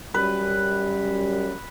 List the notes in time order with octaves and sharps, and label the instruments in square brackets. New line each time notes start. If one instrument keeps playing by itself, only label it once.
[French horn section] F#2 G3 [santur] B4